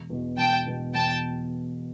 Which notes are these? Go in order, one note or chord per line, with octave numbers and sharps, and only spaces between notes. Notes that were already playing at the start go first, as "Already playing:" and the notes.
Already playing: E1
E2 B2
E1 G5 A5
E2 B2
E1 G5 A5